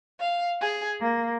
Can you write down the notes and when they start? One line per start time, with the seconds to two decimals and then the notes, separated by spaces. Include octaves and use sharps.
0.20 F5
0.60 G#4
1.00 A#3